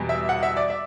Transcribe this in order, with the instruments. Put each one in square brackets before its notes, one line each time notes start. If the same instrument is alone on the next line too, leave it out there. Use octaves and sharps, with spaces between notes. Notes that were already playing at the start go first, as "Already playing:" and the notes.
Already playing: [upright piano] E2 B2 G3
E5
F#5
E5
D5
E5